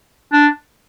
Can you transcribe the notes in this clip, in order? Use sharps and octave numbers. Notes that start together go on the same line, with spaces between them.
D4